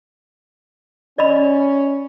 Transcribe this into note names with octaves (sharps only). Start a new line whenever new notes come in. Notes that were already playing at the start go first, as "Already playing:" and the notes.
C#4 D5 D#5 B5